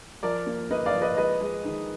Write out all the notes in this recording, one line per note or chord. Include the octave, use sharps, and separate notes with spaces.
F3 A#4 D5
A#3
A#3 B4 D#5
D5 F5
F3
B4 D#5
G#3 B4 D#5
G#3
D#3